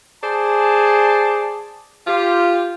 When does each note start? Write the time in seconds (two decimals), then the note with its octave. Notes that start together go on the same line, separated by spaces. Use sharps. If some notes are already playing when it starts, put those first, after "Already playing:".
0.24 G#4 C5 D5 A5
2.07 F4 G4